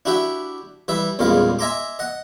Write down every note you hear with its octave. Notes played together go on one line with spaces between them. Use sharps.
D4 E4 F#4 G4 E5
E3 G3 E5
A1 E2 A#2 G3 G#3 F5
D#5 E5 G#5 A#5 C6 D6
D#5 F#5